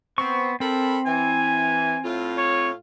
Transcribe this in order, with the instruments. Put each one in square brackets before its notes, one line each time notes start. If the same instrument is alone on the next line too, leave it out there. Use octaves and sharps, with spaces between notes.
[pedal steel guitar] B3 C#6 [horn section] C4
[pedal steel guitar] C4 [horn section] A4 A#4 B5
[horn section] E3 [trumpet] G#5
[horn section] A2 F4
[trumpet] C#5